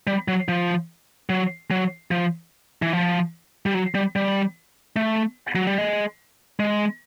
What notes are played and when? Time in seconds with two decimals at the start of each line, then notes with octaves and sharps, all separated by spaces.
0.07 G3
0.28 F#3
0.49 F3
1.30 F#3
1.71 F#3
2.11 F3
2.82 E3
2.93 F3
3.66 G3
3.74 F#3
3.95 G3
4.16 G3
4.96 A3
5.56 F#3
5.67 G3
5.78 G#3
6.60 G#3